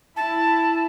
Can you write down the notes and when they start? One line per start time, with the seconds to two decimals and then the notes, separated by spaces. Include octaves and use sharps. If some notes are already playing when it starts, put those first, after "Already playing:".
0.16 E4 A5